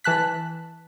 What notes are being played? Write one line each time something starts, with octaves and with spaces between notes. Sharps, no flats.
E3 A5 F#6 B6